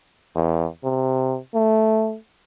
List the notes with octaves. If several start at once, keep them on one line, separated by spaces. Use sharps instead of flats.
E2
C3
A3